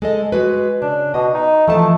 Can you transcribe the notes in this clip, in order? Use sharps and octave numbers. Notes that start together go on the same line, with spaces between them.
G#3 A4 D#5
G#3 F#4 B4
C#3 D4
B2 D#5
D#4
E3 F3 A3 A5